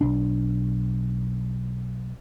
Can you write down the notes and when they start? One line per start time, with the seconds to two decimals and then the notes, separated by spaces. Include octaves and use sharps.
0.01 B1 D4